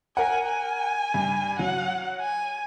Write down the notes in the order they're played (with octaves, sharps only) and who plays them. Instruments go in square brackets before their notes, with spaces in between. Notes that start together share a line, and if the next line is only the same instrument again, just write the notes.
[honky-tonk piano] A#4 F#5 [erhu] G#5
[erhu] G#5
[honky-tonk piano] G2
[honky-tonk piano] F#3 [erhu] F#5
[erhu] G#5